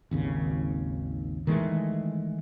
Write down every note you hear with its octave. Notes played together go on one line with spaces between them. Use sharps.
G#1 D#2 C#3
D#3 E3 G#3 A3